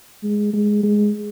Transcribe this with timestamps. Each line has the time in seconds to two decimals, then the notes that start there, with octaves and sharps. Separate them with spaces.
0.23 G#3
0.53 G#3
0.83 G#3